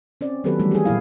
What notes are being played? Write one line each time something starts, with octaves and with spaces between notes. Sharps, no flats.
C4 C#4 D5
D#3 F#3 B3 G4 A4 B4
E3 G3 A3
G4 G#4
A#2 F#3 E4 F5